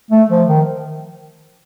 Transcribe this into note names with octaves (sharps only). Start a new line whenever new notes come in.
A3
F3
D#3